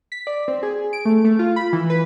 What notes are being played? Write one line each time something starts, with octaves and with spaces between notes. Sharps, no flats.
B6
D5
C4
G#4
D7
A3
A3
F4
B5
E3
B4